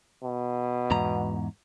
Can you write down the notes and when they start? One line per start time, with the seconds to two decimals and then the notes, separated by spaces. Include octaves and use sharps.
0.23 B2
0.91 E2 G#2 A#5